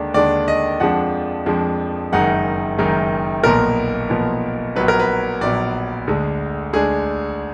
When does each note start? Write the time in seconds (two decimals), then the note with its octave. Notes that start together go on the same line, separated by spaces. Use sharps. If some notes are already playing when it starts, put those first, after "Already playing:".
Already playing: D#2 D3 G#3 D4
0.14 D#2 D3 G#3 D4 D5
0.48 D#5
0.80 F2 F3 G#3 D4 F#5
1.46 F2 F3 G#3 D4
2.12 F#1 F#2 D#3 G#3 D#4 F#5
2.78 F#1 F#2 D#3 G#3 D#4
3.44 B1 A#2 F3 B3 A#4
4.10 B1 A#2 F3 B3
4.76 A#1 A#2 F#3 B3 B4
4.88 A#4
5.00 B4
5.41 A#1 A#2 F#3 B3 D5
6.07 D2 D3 G#3 D4
6.73 D2 D3 G#3 D4 G#4